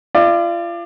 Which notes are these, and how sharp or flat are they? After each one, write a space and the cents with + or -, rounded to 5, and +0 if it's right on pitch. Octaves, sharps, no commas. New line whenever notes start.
F4 -35 D5 +25